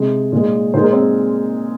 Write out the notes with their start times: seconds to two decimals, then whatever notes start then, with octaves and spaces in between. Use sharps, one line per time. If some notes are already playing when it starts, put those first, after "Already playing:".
Already playing: C3 G#3
0.32 A#2 G#3
0.74 A#2 G#3 C5
0.83 A#4
0.93 C4 C5